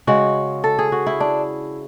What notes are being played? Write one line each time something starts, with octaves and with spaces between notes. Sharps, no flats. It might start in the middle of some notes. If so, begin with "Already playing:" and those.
C#3 G#3 F#4
A4
G#4
F#4
E4
D4